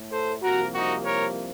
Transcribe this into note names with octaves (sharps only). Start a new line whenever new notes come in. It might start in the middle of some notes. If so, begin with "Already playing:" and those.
Already playing: A2 A3
A4 C5
C2 C3 F3 A#3 F#4 A#4
D#4 F#4
A#4 C#5